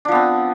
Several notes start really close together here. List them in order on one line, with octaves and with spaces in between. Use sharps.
D4 F3 B3 C4